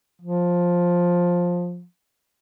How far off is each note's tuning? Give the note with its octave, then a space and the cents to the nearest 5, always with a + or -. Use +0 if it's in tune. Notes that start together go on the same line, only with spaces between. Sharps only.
F3 +10